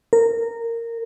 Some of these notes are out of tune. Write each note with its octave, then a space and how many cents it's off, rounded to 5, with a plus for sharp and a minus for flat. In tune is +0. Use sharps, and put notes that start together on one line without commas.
A#4 -15